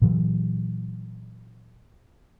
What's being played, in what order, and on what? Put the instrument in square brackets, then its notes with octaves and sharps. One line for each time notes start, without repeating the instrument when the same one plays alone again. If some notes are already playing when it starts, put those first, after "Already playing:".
[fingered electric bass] A#2 E3 F#3